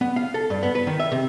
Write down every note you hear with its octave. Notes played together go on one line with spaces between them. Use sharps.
B3
F5
A4
G2
B3
B4
D#3
E5
C3